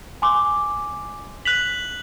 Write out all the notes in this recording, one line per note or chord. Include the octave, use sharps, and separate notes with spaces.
G#5 C6 D6
F#6 B6 F7 F#7